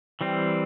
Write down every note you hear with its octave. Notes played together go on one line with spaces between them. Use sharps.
E3 G3 C4